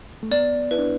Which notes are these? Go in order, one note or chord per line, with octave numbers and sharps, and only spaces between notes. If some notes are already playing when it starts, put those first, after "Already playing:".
A3
B3 D5
E4 B4
D4